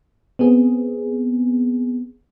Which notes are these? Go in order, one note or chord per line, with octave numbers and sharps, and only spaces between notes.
B3 C4 G#4